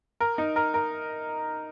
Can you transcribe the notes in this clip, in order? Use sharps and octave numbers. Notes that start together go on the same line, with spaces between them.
A#4
D#4
A#4
A#4